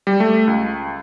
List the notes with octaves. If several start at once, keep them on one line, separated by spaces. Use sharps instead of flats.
G3
A3
C#2